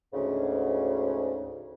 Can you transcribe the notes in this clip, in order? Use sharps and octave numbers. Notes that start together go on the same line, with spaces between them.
D2 G#2 C#3